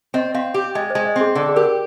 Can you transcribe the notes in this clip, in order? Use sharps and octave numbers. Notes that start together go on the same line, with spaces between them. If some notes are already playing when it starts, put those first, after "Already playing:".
C4 D#5
C4 F5
G4
G#3 D#5
G#3 C5
D#5
C4
G#4
D3 D5
G#4
G4 A#4